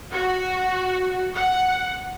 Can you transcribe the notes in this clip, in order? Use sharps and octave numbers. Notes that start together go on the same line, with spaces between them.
F#4
F#5